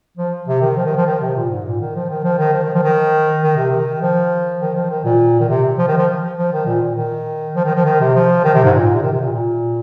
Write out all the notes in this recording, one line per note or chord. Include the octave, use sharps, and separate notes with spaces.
F3
C3
D#3
F3
D#3
F3
D#3
C3
A#2
G#2
A#2
D#3
F3
D#3
F3
D#3
F3
D#3
F3
D#3
D#3
C3
D#3
F3
D#3
F3
D#3
A#2
D#3
C3
F3
D#3
F3
F3
D#3
A#2
A#2
D#3
F3
D#3
F3
D#3
C3
F3
D#3
C3
G#2
A#2
C3
D#3
C3
A#2
A#2